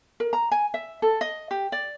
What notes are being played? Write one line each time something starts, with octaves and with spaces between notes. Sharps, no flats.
A#4
A#5
G#5
E5
A4
D#5
G4
D5